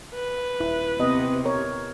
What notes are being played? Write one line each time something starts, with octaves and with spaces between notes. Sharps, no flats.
B4
D#1 E4
C3 B3 G4 D#5
A#4 C#5